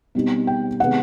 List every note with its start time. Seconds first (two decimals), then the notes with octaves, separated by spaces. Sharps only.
0.15 B2 G3 C4 D#4
0.47 G5
0.80 C3 D#3 G#3 B3 F#5